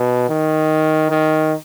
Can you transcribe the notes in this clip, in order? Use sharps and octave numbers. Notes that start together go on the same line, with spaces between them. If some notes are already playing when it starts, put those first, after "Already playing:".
Already playing: B2
D#3
D#3